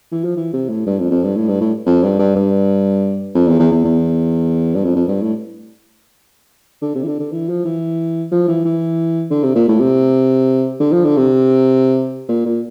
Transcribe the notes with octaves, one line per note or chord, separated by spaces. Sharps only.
E3
F3
E3
C3
A2
G2
F2
F2
G2
A2
G2
A2
F2
G2
G2
G2
F2
E2
E2
E2
E2
G2
F2
F2
G2
A2
D3
C3
E3
D3
D3
E3
F3
E3
F3
E3
E3
D3
C3
A#2
A2
C3
D3
F3
D3
C3
A#2
A#2